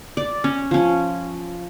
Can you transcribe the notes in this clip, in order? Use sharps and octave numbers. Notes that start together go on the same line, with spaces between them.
D5
C#4
F3 C#4